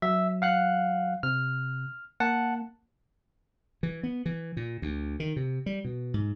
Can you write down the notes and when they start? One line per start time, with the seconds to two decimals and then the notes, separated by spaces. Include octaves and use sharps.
0.02 F#3 E5
0.42 F5 F#5 F#6
1.23 C3 F6
2.20 A#3 F#5 A5
3.83 E3
4.03 B3
4.26 E3
4.57 A#2
4.82 D2
5.20 D#3
5.36 C3
5.66 G3
5.85 B2
6.14 G#2